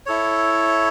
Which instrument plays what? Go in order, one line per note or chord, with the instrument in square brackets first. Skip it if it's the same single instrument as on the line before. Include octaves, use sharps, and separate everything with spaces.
[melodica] E4 A4 C#5